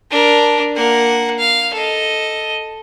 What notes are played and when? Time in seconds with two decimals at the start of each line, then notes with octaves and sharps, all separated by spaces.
0.11 D4 A#4
0.75 A#3 F#5
1.39 F5
1.74 A4 D#5